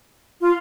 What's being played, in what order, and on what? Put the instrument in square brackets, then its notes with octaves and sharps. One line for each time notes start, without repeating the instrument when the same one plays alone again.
[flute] F4